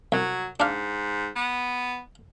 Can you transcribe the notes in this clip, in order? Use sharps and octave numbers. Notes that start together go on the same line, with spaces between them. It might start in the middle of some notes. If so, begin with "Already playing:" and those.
C2 F#3
G#2 D4 F5
B3